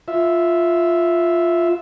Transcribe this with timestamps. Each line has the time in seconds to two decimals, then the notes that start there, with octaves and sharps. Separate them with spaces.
0.08 F4 E5